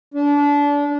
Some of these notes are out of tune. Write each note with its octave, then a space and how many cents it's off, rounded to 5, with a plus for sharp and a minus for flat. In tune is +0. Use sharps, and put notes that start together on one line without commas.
D4 -25